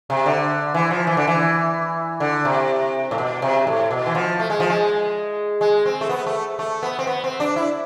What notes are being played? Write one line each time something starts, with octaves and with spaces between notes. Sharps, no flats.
C3
D3
E3
F3
E3
D3
E3
D3
C3
A2
B2
C3
A2
B2
E3
F3
A3
G#3
F3
G#3
G#3
C4
A3
B3
A3
A3
B3
C4
B3
C4
D4
E4